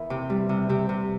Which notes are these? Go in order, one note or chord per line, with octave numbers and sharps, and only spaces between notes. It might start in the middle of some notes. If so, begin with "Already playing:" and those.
Already playing: E2 E3 A#4
C3 G4
G3
C3
C3 G4
C3